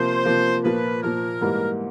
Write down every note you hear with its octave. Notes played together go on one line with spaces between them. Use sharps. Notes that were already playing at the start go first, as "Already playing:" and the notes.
Already playing: C3 F3 A#3 C5
C3 F3 A#3
A#2 F3 A#3 B4
A#2 F3 A#3 A#4
G#2 E3 G3 A#3